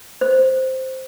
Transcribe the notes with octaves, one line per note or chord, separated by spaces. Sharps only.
C5